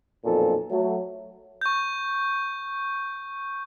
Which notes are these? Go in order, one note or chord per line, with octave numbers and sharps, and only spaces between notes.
B1 F2 A#2 A4
F#3 A3
C#6 G6